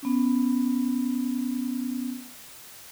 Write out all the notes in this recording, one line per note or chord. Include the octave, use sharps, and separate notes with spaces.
B3 C#4